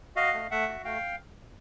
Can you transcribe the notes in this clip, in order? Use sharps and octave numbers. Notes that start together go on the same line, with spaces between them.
F#4 D#5 F5
A3
A3 E5 F#5
F#4
A3 F5 G5